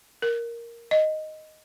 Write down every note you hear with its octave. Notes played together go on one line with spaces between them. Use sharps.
A#4
D#5